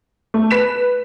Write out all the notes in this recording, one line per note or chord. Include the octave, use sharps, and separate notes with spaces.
A3
B4 B6 E7